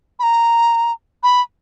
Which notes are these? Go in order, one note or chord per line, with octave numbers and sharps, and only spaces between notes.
B5
A#5
B5